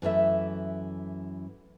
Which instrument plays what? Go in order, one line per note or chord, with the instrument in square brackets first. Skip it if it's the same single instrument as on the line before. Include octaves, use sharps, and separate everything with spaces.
[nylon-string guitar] F#2 E3 A3 E5